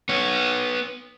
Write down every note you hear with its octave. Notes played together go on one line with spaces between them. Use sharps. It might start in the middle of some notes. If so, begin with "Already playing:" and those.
B3 C#5